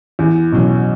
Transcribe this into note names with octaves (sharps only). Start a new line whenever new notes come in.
E2
B2 F#3